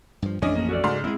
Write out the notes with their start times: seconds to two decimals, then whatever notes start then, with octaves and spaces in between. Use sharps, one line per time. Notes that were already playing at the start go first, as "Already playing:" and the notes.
0.22 G2 F3
0.42 A1 F2 A3 C#4 D4 D#5
0.56 A#3 G#4
0.69 F#4 A4 D5
0.84 G#2 C#3 C6 F6
1.04 G3 G#3 C4 E4 G#4